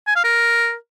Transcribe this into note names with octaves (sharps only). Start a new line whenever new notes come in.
G#5
F5
A#4